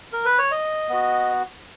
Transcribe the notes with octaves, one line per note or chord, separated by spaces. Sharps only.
A#4
B4
C#5
D#5
B3 F#4